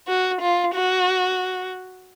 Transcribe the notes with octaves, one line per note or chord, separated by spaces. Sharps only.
F#4
F4
F#4